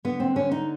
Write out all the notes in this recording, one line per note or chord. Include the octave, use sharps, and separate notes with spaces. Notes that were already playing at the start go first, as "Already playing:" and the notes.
D3 B3
C4
D3 C#4
D#4